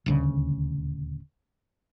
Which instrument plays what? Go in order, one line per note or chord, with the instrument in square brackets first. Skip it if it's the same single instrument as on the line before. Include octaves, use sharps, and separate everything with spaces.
[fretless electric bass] D#1 D2 C#3